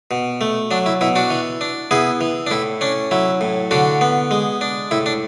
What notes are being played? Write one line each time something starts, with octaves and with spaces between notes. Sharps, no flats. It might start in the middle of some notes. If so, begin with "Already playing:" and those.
B2
A3
F#3 D4
E4
B2 E4
D4 F#4
E3
D4
B3 E4 G#4
E3
D4
A2 E4
C#4 D4
F#3 E4
A2
D3 D4 F#4
B3
G#3
D4
A2 E4
D4